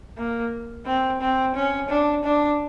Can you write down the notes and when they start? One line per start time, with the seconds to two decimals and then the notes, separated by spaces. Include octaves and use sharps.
0.17 A#3
0.86 C4
1.21 C4
1.55 C#4
1.89 D4
2.24 D4